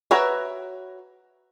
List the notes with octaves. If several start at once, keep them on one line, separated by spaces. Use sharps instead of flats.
F#4 A#4 B4 C#5 E5